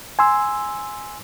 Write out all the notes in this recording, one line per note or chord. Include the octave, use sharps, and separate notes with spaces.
G#5 C6 E6